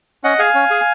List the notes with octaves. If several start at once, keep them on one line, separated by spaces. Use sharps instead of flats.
C#4 D#5 F#5
G#4 F5 G#5
C#4
G#4